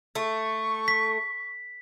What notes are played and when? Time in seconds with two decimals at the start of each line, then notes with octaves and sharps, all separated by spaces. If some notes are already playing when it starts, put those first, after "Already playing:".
0.15 A3 C#6
0.88 B6